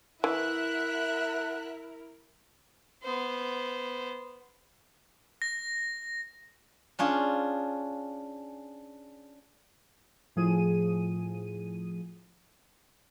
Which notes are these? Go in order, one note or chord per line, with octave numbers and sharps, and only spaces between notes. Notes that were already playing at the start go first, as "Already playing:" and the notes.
E3 E4 A#4 E5 F#5 F#6
B3 C5
A#6
C#4 D4 F4 G#4
A2 F3 G#4 D#7